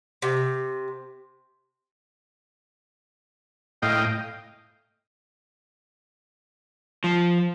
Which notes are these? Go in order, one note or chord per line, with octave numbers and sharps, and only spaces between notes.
C3
A2 D#5 F5 G5
F3